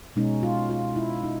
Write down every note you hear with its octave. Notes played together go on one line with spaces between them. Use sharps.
B2 G#3 C#4 D#4
F4
F4
E4
D#4